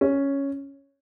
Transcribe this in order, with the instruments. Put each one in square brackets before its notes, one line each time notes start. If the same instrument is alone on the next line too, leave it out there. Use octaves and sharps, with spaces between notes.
[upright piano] C#4